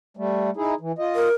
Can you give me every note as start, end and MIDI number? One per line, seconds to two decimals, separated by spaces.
0.17 0.50 55
0.17 0.50 57
0.57 0.74 63
0.57 0.74 64
0.57 0.74 68
0.80 0.92 52
0.99 1.28 65
0.99 1.28 75
1.15 1.34 70